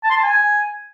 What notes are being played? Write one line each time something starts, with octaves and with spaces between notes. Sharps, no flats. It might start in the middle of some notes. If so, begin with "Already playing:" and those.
A5
C6
A5
G#5